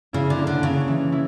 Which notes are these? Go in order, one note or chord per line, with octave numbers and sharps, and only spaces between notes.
C#3 E4
D3
A#3
D3
C#3 C#4
E3
E4